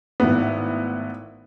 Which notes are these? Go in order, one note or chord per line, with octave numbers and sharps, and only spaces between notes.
G#1 A2 B3